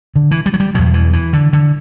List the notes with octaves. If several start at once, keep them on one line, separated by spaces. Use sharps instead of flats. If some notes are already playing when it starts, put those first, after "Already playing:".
D3
E3
G3
F#3
G3
E2 B2 F#3
E3
E3
D3
D3